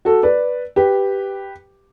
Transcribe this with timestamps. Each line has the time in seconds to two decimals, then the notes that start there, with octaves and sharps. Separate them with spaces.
0.05 F#4 A4
0.23 B4 D5
0.76 G4 B4